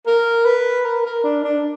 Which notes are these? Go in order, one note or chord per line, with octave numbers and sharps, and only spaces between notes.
A#4
B4
A#4
A#4
D4
D4